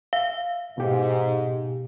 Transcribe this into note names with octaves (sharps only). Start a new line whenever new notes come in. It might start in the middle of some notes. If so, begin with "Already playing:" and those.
E5 F5
G#2 B2 G4